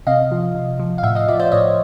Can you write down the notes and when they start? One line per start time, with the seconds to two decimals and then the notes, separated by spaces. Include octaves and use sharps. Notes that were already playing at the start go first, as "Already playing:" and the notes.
0.07 C3 D#5 F5
0.31 F3
0.55 C3
0.80 F3
0.98 F5
1.03 A2 E5 F#5
1.15 D#5 F5
1.28 F3 D5 E5
1.39 C5 D5
1.52 A2 C#5 D#5